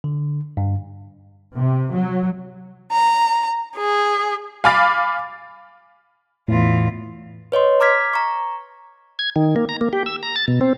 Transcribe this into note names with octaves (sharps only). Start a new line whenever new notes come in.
D3
G2
C3
F#3
A#5
G#4
F5 G#5 B5 D6 F6 A6
E2 A2 F4
B4 C#5 D#5 C6
A#5 D6 F6 G#6 B6
A#5 C#6
G#6
D#3
A#3
A#5
A#3
G4
E6
A#5
A6
B2
C4